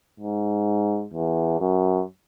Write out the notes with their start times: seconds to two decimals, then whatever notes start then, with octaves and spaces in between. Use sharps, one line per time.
0.20 G#2
1.13 E2
1.60 F#2